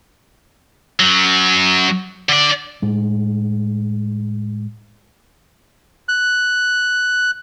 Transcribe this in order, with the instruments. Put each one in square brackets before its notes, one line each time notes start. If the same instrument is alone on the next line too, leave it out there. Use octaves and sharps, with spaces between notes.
[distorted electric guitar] F#2 F#3
D3 D5
[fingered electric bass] A2 G#3
[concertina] F#6